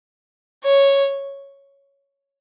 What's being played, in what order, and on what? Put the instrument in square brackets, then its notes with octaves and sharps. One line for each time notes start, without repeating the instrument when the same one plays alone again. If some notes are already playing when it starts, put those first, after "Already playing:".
[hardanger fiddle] C#5